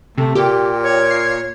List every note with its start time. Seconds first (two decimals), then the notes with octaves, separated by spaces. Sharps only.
0.17 C3 A3
0.35 A#2 G4
0.83 C#5
1.11 C7